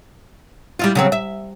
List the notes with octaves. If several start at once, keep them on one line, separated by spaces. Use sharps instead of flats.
G3 E4 F4
C#3 F#3 C4
E5